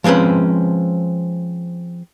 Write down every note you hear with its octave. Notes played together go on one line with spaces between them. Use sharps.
F3 G#3 C4 C#4 B4